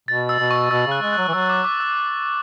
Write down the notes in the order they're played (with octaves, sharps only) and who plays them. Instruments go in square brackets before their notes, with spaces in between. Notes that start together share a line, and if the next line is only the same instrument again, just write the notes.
[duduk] B2 [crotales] A6
[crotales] E6
[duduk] B2
[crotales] C#6
[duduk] B2 [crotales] E6
[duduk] C#3 [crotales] F#6
[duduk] G#3
[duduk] F#3 [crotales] F#6
[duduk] E3
[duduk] F#3 [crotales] E6
[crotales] D6
D6
E6